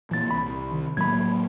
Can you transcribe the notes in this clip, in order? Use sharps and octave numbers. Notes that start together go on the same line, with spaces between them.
A#2 E3 A#3 A6
C2 B5
D#3
A2 F#3 A#3 B5 G#6